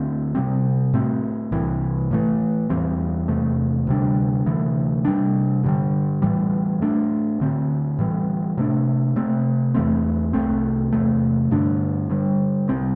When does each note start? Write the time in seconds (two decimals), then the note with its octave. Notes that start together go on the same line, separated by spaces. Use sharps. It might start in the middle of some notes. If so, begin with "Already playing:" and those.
Already playing: D2 D3 C4
0.35 C3 G3 C4
0.93 A2 A3 C4
1.52 C2 C3 E3
2.11 A2 E3 A3
2.70 E2 E3 G3 C4
3.28 E2 C3 A3
3.87 D2 C3 G3 D4
4.46 D2 C3 E3
5.05 C3 G3 D4
5.64 G2 D3 G3
6.22 A2 E3 G3
6.81 A2 A3 D4
7.40 D2 D3 C4
7.99 A2 E3 G3
8.58 C3 A3 D4
9.16 C3 A3 C4
9.75 E2 E3 A3 C4
10.33 C2 C3 A3 C4
10.92 E2 C3 A3
11.51 G2 D3 A3 D4
12.10 G2 D3 G3
12.69 C2 C3 G3 C4